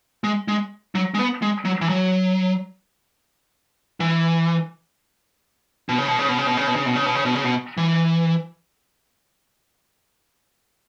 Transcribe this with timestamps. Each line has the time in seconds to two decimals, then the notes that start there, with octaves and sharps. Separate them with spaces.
0.24 G#3
0.48 G#3
0.95 F#3
1.14 G#3
1.19 B3
1.42 G#3
1.65 F#3
1.81 E3
1.89 F#3
4.00 E3
5.89 B2
5.98 C#3
6.08 B2
6.19 C#3
6.28 B2
6.38 C#3
6.47 B2
6.57 C#3
6.67 B2
6.76 C#3
6.86 B2
6.95 C#3
7.06 B2
7.15 C#3
7.25 B2
7.35 C#3
7.44 B2
7.77 E3